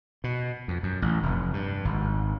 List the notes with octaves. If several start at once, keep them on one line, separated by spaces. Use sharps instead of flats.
B2
F2
F#2
A1
F1
G2
G#1